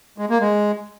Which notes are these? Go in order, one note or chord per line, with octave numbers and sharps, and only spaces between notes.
G#3
A#3
G#3